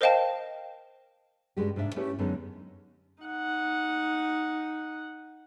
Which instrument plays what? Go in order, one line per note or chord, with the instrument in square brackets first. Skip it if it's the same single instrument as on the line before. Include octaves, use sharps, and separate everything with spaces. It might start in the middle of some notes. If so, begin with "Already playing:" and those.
[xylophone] A#4 C5 D#5 F5 G5 A5
[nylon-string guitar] G2 C#3 G#3 F#4 G4
G#2 C3 D4 E5
A3 C#4 E4 G4 B4 C#5
F#2 D3 G#3 B3 C#4 D#4
[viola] D#4 F#5